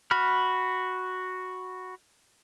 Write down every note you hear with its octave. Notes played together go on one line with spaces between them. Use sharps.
F#4 B5 F6